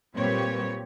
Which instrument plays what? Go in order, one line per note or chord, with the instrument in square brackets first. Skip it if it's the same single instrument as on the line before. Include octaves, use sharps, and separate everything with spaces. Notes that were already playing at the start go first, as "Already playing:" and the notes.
[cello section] A#2 G3 C4 G4 B4 C#5